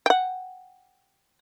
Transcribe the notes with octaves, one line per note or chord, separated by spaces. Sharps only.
F#5 G5